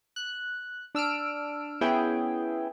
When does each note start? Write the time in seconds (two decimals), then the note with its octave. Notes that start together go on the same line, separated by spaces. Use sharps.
0.16 F#6
0.95 D4 E6 F6 D7
1.81 B3 C#4 E4 G#4 G5